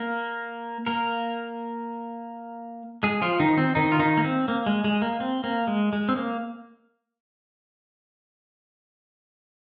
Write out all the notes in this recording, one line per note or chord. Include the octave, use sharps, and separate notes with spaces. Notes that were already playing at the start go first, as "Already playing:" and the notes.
Already playing: A#3 A#4
A#3 A#4
G#3 G#4
F3 F4
D#3 D#4
C4
D#3 D#4
F4
D#3 D#4
A#3
C4
A#3
G#3
G#3
A#3
C4
A#3
G#3
G#3
C4
A#3